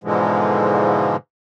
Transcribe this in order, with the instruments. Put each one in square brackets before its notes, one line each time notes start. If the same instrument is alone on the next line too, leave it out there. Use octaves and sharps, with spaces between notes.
[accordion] G#2 B2 D3 E3 F3 G#3